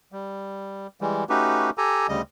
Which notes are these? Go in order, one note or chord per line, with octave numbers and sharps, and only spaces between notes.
G3
E3 G3 G#3
A3 C#4 D#4 F#4 G4 B4
G4 A4 G#5 A#5
D2 C#3 G3 D#5